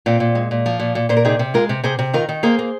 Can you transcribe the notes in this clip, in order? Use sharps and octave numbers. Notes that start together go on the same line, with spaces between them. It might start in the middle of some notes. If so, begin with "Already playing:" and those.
A#2 C4 F4
A#2
G#3
A#2
F3
A#2
A#2
A#2 C5
A#4
C3 D#4 G#4
C3
G#3 F4 A#4
C3
C3 G#4 C5
C3
D#3 F4 A#4
D#3
A#3 G#4 C5
A#3